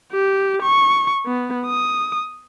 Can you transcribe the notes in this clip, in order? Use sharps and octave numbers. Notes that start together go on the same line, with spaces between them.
G4
C#6
B3
D#6